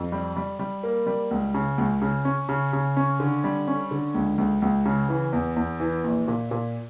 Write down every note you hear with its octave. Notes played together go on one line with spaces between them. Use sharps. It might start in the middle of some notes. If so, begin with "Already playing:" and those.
Already playing: F2
G3
G3
G3
A#3
G3
C#2
C#3
C#2
C#3
C#4
C#3
C#3
C#4
D3
G3
C#4
D3
C#2
C#2
C#2
C#3
E3
E2
E2
E3
A#1
A#2
A#2